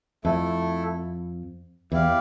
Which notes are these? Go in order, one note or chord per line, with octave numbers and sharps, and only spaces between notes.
F2 A3 E4 A4
E2 E4 G4 D5 F5